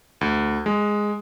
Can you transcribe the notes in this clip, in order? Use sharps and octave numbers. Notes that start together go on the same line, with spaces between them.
D2
G#3